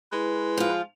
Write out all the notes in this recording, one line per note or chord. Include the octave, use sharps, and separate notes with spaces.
G#3 E4 B4
F3 F4